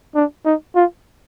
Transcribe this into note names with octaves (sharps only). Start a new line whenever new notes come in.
D4
D#4
F4